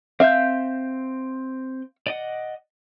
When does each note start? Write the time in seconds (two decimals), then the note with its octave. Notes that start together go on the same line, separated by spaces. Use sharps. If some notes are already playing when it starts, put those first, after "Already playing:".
0.20 C4 E5 F5 G6
2.07 D5 D#5 F#5